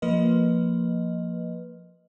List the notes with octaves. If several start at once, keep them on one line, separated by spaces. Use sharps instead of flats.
F3 A#3 B4 D#5